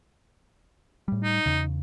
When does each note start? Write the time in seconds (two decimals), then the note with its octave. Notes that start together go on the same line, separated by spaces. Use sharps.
1.08 A2 G3
1.24 D#4
1.46 E2 C#3